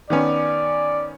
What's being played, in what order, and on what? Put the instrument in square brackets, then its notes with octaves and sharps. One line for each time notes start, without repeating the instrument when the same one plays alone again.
[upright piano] D#3 B3 C#4 [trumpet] D5